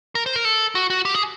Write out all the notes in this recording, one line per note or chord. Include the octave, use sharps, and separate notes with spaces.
A#4
C5
A#4
A4
F#4
F#4
G4
G#4